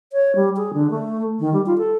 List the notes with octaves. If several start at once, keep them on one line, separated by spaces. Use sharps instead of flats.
C#5
G3
G#4
D3
A3
D#3
G3
F4
A4